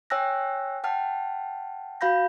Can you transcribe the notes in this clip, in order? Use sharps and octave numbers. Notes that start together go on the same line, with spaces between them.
C#5 G5 G#5 E6 F#6 A#6
F#5 G5 A5 F6
F#4 F5 B5 G6 A#6